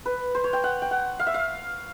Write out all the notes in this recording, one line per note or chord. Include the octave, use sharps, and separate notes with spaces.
B4
C5
C#5
G5
F#5
G5
F#5
F5
E5
F5